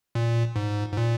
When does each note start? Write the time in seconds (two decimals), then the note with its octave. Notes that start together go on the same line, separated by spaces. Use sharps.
0.15 A#2
0.56 G#2
0.92 G#2
0.97 A#2